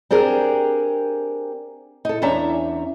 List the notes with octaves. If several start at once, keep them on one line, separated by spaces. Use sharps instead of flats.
C4 D4 G4 G#4 A#4
D#4 A4
E2 C#4 D4 E5 A#5